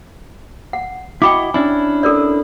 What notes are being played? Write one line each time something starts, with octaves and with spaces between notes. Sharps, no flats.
F#5
E4 F#4 D#5 G5 B5 D6
C#4 D4 E4 G#5
A4 A#4 D5